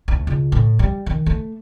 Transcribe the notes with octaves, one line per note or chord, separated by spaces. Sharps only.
D2
C#2
A2
G3
D#3
A3